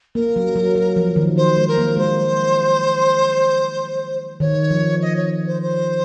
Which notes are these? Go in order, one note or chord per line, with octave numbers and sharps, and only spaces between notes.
A#3 A#4
F#3
F#3
F#3
F3
D#3
F3 C5
G#3
A#4
A#3
G#3 C5
D#3 C#5
F3
D#5
C#5
C5
C5